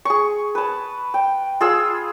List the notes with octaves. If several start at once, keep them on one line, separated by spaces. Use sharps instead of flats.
G#4 C#6
B4 A5
G5
F4 G#4 E6